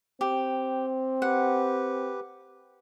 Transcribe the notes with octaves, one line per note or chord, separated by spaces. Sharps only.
C4 G4
G4 B4 F#5